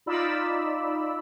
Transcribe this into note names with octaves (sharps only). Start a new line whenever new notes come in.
D#4 F4 D5 B5 E6